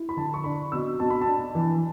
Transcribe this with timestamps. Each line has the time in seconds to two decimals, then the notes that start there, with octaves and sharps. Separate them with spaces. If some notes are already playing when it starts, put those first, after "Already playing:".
Already playing: E4
0.09 B5
0.17 D3 A5
0.34 C#6
0.44 D4 B5
0.72 B2 E6
1.00 B2 A5
1.10 B5
1.21 A5
1.27 D4
1.55 E3